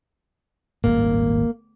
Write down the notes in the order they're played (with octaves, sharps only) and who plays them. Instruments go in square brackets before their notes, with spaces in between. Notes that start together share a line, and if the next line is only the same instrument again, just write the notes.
[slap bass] D#1 G#1 A2 [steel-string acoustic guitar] A#3